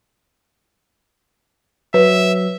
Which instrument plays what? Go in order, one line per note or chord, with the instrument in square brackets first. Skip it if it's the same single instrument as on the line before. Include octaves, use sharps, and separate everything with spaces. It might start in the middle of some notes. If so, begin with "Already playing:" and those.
[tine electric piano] F#3 [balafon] B4 [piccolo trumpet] E5